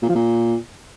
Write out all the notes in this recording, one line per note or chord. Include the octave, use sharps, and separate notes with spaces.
A#2
F3
A#2